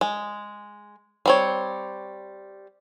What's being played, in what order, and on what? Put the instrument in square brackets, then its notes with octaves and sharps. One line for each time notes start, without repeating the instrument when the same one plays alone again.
[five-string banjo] G#3
G3 C4 C#5